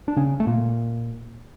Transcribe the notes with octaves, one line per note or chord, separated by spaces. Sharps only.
D4
C#3 C#4
A3
A#2 A#3